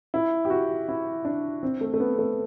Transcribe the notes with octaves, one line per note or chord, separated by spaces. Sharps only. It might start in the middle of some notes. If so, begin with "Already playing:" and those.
E4
G4
F#4
E4
D4
C4
A3
A3
B3
A3